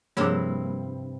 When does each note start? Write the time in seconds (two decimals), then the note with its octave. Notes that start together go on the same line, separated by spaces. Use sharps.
0.17 G2 C3 F3 G3 A#3 E4 G#4 C#5